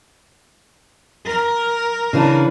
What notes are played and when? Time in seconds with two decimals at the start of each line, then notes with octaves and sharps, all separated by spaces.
1.25 A#4
2.13 C#3 E3 D4